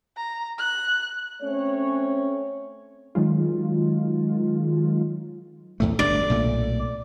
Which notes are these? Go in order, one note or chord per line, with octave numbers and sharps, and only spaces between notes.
A#5
F#6
A3 C4 C#4 C#5
D#3 F#3 G#3 F4
E2 A2 A3
G1 A3 D4 D5
B1 A#2 A3